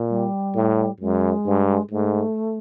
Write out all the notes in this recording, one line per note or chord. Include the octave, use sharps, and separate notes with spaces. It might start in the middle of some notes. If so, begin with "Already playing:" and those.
Already playing: A#2
G3
A2
F#2 G#3
G2
G#2 A3